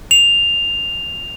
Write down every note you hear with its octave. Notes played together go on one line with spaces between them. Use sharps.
F7